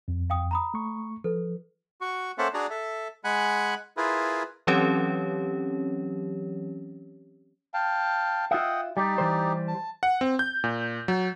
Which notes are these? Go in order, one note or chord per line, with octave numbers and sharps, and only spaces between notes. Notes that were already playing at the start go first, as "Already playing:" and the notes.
F2
F5 G5 D#6
A#5 B5 D#6
A3 C#6
F3 A4 B4
F#4 C#6
A#3 C#4 A4 C5 E5 F#5
D4 F#4 G#4 D5 A#5
A4 E5
G#3 F#5 G#5 B5 F#6
E4 F4 G#4 A#4 B4
E3 F#3 C4 C#4 G4 C#5
F5 G5 A5
F4 D#5 E5 F#5 G5
G3 D#4 G4 D5
E3 G3 C5
A5
F#5
C4
G6
A#2
F#3